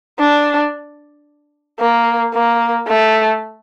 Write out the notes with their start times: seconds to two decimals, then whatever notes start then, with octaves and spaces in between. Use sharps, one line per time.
0.19 D4
1.80 A#3
2.34 A#3
2.87 A3